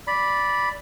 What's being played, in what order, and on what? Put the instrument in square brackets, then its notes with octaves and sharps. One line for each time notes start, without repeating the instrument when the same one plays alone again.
[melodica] D5 B5